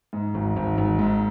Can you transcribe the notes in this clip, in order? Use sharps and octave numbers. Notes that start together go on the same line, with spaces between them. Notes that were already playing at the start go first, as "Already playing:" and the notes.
G#2
G#1
G#1
G#1
G#2